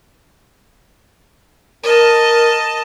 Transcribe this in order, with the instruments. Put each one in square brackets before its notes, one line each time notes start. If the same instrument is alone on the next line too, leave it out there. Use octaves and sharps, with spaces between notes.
[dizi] A#4 [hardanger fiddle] D#5 A5